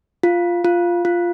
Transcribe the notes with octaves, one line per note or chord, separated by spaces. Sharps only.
F4
F4
F4